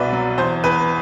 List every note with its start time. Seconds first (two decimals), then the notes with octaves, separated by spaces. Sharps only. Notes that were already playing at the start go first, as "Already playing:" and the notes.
Already playing: C2 B2 B4 D5 E5
0.13 F#3
0.38 E2 C5
0.64 E2 B4